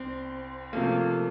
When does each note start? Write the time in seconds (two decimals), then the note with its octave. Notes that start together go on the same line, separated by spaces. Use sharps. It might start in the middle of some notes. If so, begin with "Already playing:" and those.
Already playing: C2 C4
0.73 C3 F3 A3 A#3